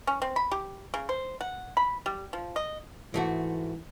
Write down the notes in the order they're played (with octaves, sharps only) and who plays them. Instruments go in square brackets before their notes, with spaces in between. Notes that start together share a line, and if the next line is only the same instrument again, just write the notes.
[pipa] C#4
C4
B5
G4
C#3
C5
F#5
B5
G3
F3
D#5
[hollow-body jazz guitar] G#2 A3 F#4 [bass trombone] E3